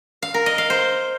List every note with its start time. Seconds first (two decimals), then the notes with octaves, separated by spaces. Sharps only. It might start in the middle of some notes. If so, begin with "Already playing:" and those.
0.22 F5
0.34 A#4
0.46 D#5
0.58 F5
0.70 C5